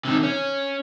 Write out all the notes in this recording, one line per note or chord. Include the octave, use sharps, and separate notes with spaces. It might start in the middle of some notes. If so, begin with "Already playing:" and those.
C3 D#3
C#4